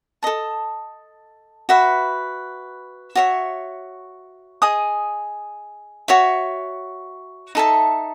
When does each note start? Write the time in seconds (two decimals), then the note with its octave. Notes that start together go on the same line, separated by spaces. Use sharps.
0.23 A4 D#5 A5
1.69 F#4 B4 E5 B5
3.15 F#4 C#5 E5
4.62 G#4 D#5 G#5 D#6
6.08 F#4 C#5 E5
7.55 D#4 A4 E5 A5